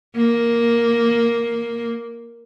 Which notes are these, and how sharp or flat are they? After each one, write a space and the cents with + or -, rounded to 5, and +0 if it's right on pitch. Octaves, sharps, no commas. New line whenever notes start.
A#3 +5